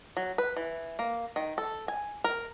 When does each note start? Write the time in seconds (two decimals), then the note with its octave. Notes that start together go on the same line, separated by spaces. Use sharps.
0.17 F#3
0.38 B4
0.57 E3
0.99 A#3
1.36 D#3
1.58 A4
1.88 G#5
2.24 A#4